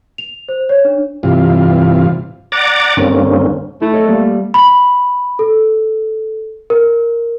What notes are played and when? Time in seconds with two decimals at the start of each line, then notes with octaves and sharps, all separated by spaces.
0.18 F7
0.49 C5
0.69 C#5
0.85 D4
1.23 G2 C3 E3 F4
2.52 D5 F#5 A#5 D6 A6
2.97 G2 D3 A#3 C4 C#4
3.82 A3 E4
3.94 A4 C#5 D#5
4.09 G3 A#3 D5
4.54 B5
5.39 A4
6.70 A#4